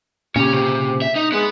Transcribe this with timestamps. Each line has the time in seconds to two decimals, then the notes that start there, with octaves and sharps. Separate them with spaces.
0.36 A#2 C#3 C#4 G4
0.53 C3
1.02 E5
1.16 D#4
1.32 G#3 B3